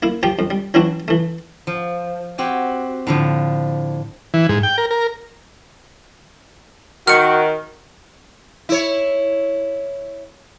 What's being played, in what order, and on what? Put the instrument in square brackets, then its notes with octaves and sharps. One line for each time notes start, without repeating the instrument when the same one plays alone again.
[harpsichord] A#3 E4
F3 G4 G5
F2
G3
E3 F#3 C4 D4 E4 F#4
E3 A3
[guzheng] F3
C4 F#4 G4 G#5
A2 D3 F3
[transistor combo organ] E3
G#2
G5
A#4
A#4
[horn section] D#3 [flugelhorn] F#4 [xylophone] F6 C#7
[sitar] E4 C#5